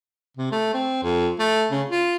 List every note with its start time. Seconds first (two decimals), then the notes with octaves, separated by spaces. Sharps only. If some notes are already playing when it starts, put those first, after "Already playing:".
0.37 C3
0.52 A3
0.74 C4
1.04 F2
1.39 A3
1.71 C#3
1.90 F4